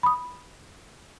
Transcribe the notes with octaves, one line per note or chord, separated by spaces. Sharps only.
B5 D#6